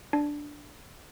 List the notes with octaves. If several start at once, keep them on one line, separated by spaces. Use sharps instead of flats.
D4